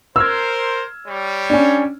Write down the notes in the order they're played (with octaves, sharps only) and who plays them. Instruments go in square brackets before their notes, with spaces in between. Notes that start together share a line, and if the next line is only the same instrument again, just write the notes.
[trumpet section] A#4 C5 [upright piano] E6 F6 G#6
[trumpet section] G3 C#5
[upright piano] C#4 D4